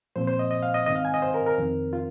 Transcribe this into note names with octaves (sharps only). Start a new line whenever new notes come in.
A#2 F3 C4 C5
C5
D#5
D#5
F5
D#5
G#2 D#3 C4 D#5
F5
G#5
D#5
C5
A#4
A#4
F2 D#3 C4
F4